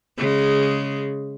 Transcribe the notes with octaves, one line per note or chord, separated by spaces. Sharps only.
C#3 G#3